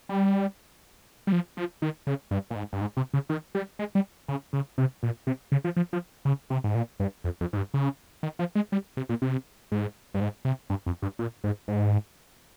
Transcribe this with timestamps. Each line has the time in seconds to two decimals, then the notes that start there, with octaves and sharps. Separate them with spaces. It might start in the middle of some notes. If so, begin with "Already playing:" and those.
0.09 G3
1.27 G3
1.32 F3
1.57 F3
1.82 D#3
2.07 C#3
2.31 G2
2.50 A#2
2.56 G#2
2.73 G2
2.81 G#2
2.97 C3
3.14 C#3
3.29 D#3
3.55 G3
3.79 G#3
3.95 G3
4.28 C#3
4.53 C#3
4.78 C3
5.03 A#2
5.27 C3
5.52 C#3
5.64 F3
5.76 F3
5.93 F3
6.25 C#3
6.50 C3
6.64 G#2
6.75 A#2
7.00 G2
7.24 F2
7.41 F2
7.53 G#2
7.57 G2
7.74 C#3
8.23 D#3
8.39 F3
8.55 G#3
8.72 G3
8.97 C3
9.09 A#2
9.22 C3
9.72 G#2
10.14 G2
10.21 G#2
10.45 C3
10.70 G2
10.86 F2
11.02 G2
11.19 A#2
11.44 G#2
11.68 G#2